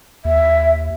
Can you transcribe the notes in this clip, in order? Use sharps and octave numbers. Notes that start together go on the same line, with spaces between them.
D#2 E5